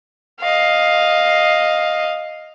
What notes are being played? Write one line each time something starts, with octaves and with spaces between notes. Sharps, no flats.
D#5 F5